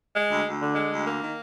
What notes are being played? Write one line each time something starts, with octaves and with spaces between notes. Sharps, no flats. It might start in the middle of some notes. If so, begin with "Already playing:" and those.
G#3
D2
D2
D3
G#3
D2
A#3
D#3